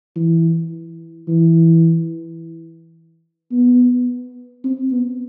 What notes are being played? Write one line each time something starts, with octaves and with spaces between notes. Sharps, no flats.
E3
E3
B3
C4
B3